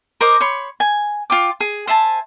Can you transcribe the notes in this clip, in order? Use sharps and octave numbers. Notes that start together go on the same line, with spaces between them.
A#4 C5 D#5 D6
C#5 B5 C6
G#5
F4 G5 D6
G#4
C5 E5 G#5 A5